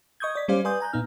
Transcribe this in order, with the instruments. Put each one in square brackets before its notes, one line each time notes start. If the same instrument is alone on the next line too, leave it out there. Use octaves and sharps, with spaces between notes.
[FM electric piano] D#5 C#6 D#6 G6 G#6
D5 B6
G3 C#4 G4 C5 D5 F5
B4 D5 G#5 C6 D#6 G6
G#5 A#5 F#6 G6
A#2 B3 D#4 F6